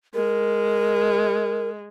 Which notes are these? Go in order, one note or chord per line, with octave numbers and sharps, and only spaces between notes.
G#3 A#4